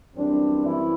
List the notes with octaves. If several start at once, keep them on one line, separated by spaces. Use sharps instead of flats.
F#2 E3 G3 C4 D4
E3 E4